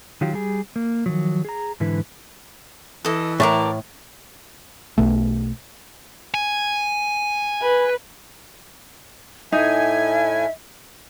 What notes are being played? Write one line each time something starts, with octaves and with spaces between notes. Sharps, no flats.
D#3 F#3 F4 G4
G3 G#4
A#3
D#3 F3 F#3
G#4 A#5
G#2 D3 E3 E4 B4
E3 A4 D#5
A2 A#4 D5 A5
B1 B2 A3
G#5
B4
A2 D#4 E5 G#5